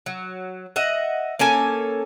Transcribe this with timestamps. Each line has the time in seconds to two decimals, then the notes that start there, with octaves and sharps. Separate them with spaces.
0.06 F#3
0.76 D#5 E5 F#5
1.39 A#3 C#4 A4 G#5